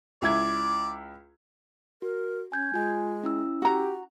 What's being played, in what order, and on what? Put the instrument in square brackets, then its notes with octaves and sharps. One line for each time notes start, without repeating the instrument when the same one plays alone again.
[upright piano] C#2 E4 G#6 [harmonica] D5
[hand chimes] F#4 [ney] A#4
[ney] C#4 [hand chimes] G#5 G6 G#6
[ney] G#3 [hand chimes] F4 G#5
[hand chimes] C#4 E4 E6
[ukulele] F#4 A#5 [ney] G4